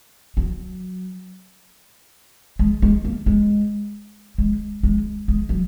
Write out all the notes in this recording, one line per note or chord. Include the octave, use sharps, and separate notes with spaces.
F#3
G#3
G#3
A#3
G#3
G#3
G#3
G#3
F#3